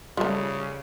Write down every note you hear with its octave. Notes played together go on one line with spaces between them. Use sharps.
C#3 F3 G3 A3